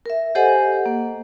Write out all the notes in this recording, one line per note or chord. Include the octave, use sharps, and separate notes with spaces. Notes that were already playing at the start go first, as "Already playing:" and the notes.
A#4 E5
G4 A4 C5 D#5 F#5 G#5
A#3